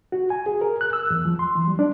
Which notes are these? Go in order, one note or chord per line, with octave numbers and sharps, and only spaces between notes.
F#4
G#5
G#4
A#4
F#6
E6
E2
F3
C6
E3
G3
D4